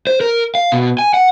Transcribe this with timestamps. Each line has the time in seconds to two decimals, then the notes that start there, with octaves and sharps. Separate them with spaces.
0.07 C5
0.21 A#4
0.55 F5
0.72 B2
0.99 G#5
1.14 F#5